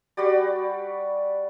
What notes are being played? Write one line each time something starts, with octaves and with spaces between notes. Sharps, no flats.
G3 F#4 G4 D5